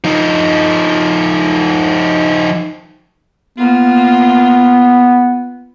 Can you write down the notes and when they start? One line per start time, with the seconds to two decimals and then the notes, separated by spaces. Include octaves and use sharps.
0.04 F3 D#4
3.58 A#3 B3 F4